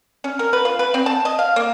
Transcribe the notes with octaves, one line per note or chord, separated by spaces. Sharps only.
C#4
A#4
B4
F4
B4
C4
A5
D#5
F5
A#3